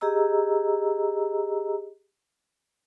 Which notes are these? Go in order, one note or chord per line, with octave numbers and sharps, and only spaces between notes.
G4 G#4 D#5 A#5 E6